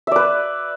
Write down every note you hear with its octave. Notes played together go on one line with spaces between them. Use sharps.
B4 D5 E5